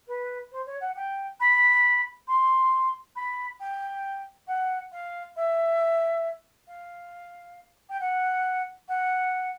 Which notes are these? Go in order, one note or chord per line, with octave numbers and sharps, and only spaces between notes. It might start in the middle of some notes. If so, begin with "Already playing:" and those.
B4
C5
C#5
F#5
G5
B5
C6
B5
G5
F#5
F5
E5
F5
G5
F#5
F#5